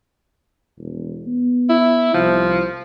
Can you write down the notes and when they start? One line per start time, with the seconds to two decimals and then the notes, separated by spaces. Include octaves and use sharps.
0.78 E1
1.27 B3
1.70 E4
2.14 C2 F3